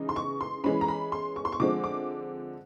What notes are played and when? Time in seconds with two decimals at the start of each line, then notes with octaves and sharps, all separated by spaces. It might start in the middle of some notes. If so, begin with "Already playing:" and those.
Already playing: C#3 E3 G#3 D#4
0.09 C6
0.16 C#6
0.41 C6
0.64 E3 G#3 C#4 B5
0.81 A#5
0.88 B5
1.12 C6
1.36 C#6
1.45 C6
1.52 C#6
1.60 D3 F3 G#3 C4 D6
1.84 D6